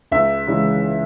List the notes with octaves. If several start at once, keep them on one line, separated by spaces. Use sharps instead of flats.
C#2 E5
C#3 E3 G#3